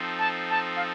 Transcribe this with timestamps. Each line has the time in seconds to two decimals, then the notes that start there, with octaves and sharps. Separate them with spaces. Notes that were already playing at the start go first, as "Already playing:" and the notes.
Already playing: F3 C4 D#4 A4
0.19 A5
0.50 A5
0.76 F5